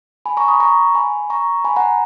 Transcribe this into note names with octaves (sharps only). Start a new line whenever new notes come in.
G#5 B5
A#5 C#6
B5 D#6
A#5 C#6
G#5 B5
A#5 C#6
G#5 B5
F#5 A#5